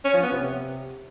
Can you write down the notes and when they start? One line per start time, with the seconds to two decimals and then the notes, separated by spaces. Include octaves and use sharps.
0.05 C#4
0.14 F3
0.23 B3
0.32 C3